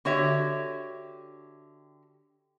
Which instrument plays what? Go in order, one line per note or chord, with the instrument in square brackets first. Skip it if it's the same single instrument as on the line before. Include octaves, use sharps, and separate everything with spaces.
[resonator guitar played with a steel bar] D3 F#4 G4 C#5 E5